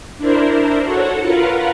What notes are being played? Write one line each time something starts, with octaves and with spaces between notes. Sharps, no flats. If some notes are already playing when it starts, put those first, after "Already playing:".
D4 E4 A#4 C5
F#4 A4 C#5 F#5
F4 A#4 B4 F5 F#5